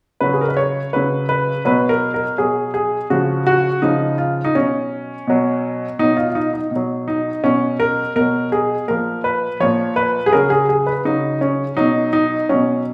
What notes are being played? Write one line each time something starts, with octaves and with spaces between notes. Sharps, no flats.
C#3 F#3 B4
G#4
A#4
B4
C#5
C#3 F#3 B4
B4
B2 F#3 B4
A#4
A#4
B2 F#3 G#4
G#4
C#3 F3 F#4
F#4
C#3 F3 D#4
F4
D#4
B2 F#3 C#4
B2 F#3
B2 F#3 D#4
F4
F4
D#4
D#4
B2
F#3
D#4
B2 F#3 C#4
A#4
B2 F#3 A#4
G#4
A#2 F3 A#4
B4
A#2 F3 C#5
B4
G#4
C#3 F#3 A#4
G#4
G#4
B4
C#3 F#3 D#4
C#4
B2 F#3 D#4
D#4
B2 F#3 C#4